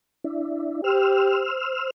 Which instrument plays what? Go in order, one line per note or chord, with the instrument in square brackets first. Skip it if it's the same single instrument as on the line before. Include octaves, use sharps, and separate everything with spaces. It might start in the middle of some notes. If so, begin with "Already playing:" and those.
[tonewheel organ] D4 E4
[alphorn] G4 [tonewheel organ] C5 E6 F6